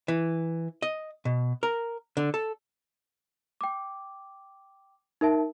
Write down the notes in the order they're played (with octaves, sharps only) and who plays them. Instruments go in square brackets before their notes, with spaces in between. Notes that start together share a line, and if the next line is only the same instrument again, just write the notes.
[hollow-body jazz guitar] E3
D#5
B2
A#4
D3
A4
[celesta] G5 D6
D#4 A#4 E5 A5